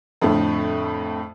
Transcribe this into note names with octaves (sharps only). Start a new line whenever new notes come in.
F2 A2 D3 A3